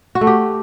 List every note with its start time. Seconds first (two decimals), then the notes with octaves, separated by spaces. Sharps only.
0.15 F#4
0.21 A3
0.27 G4